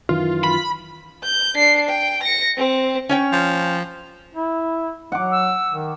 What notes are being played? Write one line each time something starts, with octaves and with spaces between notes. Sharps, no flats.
F#2 D#3 E3 F4
B5
G6
D4 C7
G5
A#6 C#7
C4
C#4 C#5 G5
F3
E4
F#3 F#5 D6
E6
D#3